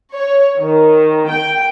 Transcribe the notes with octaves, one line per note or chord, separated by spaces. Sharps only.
C#5
D#3
G5